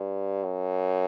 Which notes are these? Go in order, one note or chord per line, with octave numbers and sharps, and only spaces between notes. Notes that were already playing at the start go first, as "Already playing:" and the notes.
Already playing: G2
F#2